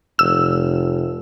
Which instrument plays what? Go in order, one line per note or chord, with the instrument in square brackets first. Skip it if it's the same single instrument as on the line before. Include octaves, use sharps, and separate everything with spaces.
[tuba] F1 [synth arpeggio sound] E6